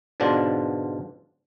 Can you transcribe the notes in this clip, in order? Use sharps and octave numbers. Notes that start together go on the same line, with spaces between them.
G#2 B2 D3 D4 F4